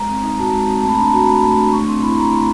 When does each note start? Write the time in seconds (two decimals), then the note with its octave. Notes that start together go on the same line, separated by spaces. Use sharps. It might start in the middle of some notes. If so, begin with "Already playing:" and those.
Already playing: G#3 A#5
0.08 C4
0.23 D#4
0.38 F#4 A5
0.53 G#3
0.68 C4
0.82 A3 A5
0.89 B5
0.94 A#5
0.97 D4
1.06 A5
1.13 F#4
1.27 A3 B5
1.43 A3
1.58 D4
1.72 A3 C#6
1.87 C4 C6
2.02 E4 B5
2.17 A3 A#5
2.32 A3